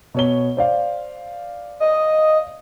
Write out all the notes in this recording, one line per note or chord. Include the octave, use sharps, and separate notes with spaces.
B2 C#5 G7
C5 D5 F5
D#5